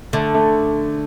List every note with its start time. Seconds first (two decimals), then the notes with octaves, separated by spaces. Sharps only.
0.13 D3 A3
0.34 A3